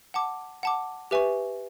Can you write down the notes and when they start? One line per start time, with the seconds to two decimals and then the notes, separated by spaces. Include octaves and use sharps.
0.14 F#5 A5 D6
0.63 F#5 A5 D6
1.11 G4 B4 E5 G#5 C#6